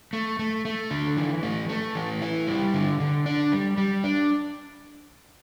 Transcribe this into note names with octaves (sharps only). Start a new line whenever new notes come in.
A3
A3
A3
D3
E3
A3
A3
E3
E4
G3
D3
D3
D4
G3
G3
D4